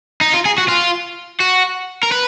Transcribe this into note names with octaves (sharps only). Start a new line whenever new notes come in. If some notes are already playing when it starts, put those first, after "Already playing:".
D#4
F4
G#4
F#4
F4
F#4
A#4
B4